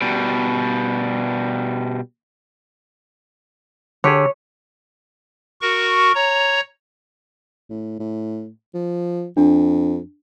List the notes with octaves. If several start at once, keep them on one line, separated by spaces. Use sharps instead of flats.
B2 G3
D3 G4 G#4 C#5
F#4 A#4 C#6
C#5 A#5
A2
A2
F3
F2 D4